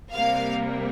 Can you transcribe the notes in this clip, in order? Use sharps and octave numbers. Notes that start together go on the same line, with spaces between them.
C3 G3 A#3 F5